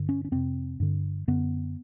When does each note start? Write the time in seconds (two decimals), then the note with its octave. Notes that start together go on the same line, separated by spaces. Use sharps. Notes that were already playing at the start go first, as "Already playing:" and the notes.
Already playing: G2 D3
0.09 C#4
0.25 C#4
0.31 F2 C3 C4
0.80 G2 D3
1.28 F#2 D3 B3